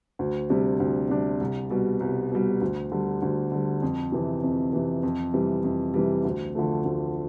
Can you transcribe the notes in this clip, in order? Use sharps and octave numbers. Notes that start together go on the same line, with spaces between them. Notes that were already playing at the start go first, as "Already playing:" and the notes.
D2
C3 G3 D4
D2
C3 G3 D4
C2
B2 G3
C2
B2 G3
D2
D3 G3
D2
D3 G3
F2
C3 E3
F2
C3 E3
F2
C3 E3 G3
F2
C3 E3 G3
D2
D3 F3 A3
D2